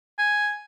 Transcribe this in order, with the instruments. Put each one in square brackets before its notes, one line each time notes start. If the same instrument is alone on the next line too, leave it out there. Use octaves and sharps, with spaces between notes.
[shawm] G#5